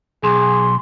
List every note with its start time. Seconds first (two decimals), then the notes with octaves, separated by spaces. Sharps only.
0.24 B1 G#4 C6